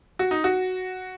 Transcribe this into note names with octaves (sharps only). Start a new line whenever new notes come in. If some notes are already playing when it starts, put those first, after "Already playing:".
F#4
D#4
F#4